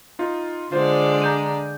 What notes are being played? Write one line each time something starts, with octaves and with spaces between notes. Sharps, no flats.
D#4 F4
D3 G#3 F4 C5 D5
A#5 G6 D#7